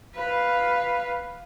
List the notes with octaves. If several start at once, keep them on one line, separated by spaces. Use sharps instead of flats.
B4 F5